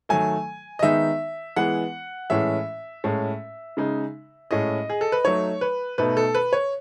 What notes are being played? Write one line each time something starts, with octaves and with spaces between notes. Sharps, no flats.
D#3 F#3 A3 G#5
D#5
D#3 G#3 B3 D#4 E5
E3 G#3 B3 E4 F#5
A2 E3 G#3 C#4 E4 E5
A2 G#3 C#4
C#3 G#3 D#4
A2 G#3 C#4 E4 D#5
G#4
A4
B4
F#3 A3 D#4 C#5
B4
B2 A3 D#4 B4
A4
B4
C#5